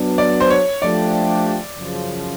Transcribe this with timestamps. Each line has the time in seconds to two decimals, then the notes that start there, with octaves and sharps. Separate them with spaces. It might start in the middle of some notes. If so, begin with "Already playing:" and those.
Already playing: F#3 B3 D4
0.18 D5
0.40 C5
0.50 C#5
0.82 F3 A3 D4 G4 D5
1.77 F#2 C#3 F3